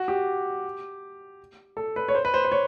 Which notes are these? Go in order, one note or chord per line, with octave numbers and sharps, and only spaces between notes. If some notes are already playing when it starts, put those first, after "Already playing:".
Already playing: F#4
G4
A4
B4
C#5
C5
B4
C5
C5
C#5